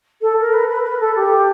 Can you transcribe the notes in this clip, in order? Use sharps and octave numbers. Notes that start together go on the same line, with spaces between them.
A4
A#4
B4
B4
B4
A4
G4